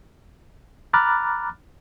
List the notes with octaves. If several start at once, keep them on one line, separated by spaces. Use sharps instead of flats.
A#5 B5 D6 F6 F#6 A6